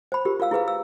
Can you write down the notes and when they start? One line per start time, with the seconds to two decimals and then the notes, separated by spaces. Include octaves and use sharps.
0.12 C5 B5
0.25 F4 G4 A#4
0.40 F4 A#4 F5 E6
0.51 E4 G#4 B4 F5
0.68 E6